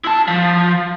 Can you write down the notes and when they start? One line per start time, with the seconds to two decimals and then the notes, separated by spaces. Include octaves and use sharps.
0.04 E4 A5
0.28 F3